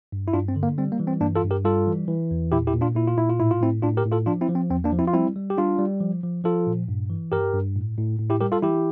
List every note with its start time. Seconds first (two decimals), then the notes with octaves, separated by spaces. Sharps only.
0.12 G2
0.28 E4
0.33 G2 D4 F4
0.48 C4
0.56 D3
0.63 A#3
0.78 G3 C4
0.92 A#3
1.00 E3
1.07 C4
1.21 G2 A#3 D4
1.36 F4 A4
1.44 G2
1.51 G4 A#4
1.65 G3 F4 A4
1.87 E3
2.08 E3
2.31 E2
2.52 A#2 E4 G4
2.67 E4 G4
2.73 A#2
2.81 D4 F4
2.95 A#2 E4
3.07 F4
3.17 A#2 E4
3.29 F4
3.39 A2 E4
3.51 F4
3.61 A2 C4 E4
3.82 A2 D4 F4
3.97 G4 A#4
4.05 A2
4.12 F4 A4
4.26 F3 D4 F4
4.41 C4 E4
4.49 F3
4.55 C4
4.70 E2 C4
4.84 A#3 D4
4.93 F3
4.99 C4 E4
5.07 F4
5.13 G3 C4 E4
5.36 G3
5.50 G4
5.57 G3 D4 F4
5.79 G3
6.01 F3
6.24 F3
6.44 F3 F4 A4
6.67 A#2
6.88 G2
7.10 E3
7.32 G2 G4 A#4
7.54 G2
7.76 A2
7.98 A2
8.19 A2
8.30 E4 G4
8.41 G3 G4 A#4
8.52 F4 A4
8.62 E3 E4 G4